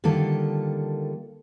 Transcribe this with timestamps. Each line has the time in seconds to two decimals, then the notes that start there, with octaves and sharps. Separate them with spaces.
0.04 D3 D#3 G3 A#3 F4 A4